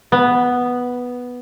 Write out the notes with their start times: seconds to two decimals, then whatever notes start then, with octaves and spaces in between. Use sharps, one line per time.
0.12 B3